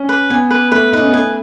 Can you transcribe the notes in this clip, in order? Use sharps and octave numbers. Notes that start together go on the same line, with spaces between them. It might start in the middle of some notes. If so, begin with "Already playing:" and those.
Already playing: C#4
B4
B3 G#5
B4
A3 B4
D#4 B4
C#4
B3
A3 G#5